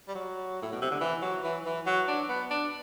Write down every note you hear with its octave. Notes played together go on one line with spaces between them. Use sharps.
G3
F#3
A2
B2
C3
D3
E3
F#3
E3
E3
F#3
D4
B3
D4